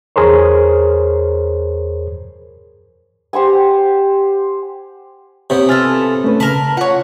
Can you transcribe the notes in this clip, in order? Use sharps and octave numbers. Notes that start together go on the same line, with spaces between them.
E2 G#4 A#4 C5 C#5
G4 C5 F#5 G#5
C3 B3 G4 C#5
F4 A4 G#5 F6 A6
A3 C#4 B4
C#3 A#4 A5 B5
F4 C#5 F#5